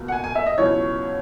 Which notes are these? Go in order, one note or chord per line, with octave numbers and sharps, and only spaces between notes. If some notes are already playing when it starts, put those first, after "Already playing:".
Already playing: C#2 B2 A#3
F#5
G#5
G#5
E5
D#5
C#2 B2 F#3 C#4 E4 C#5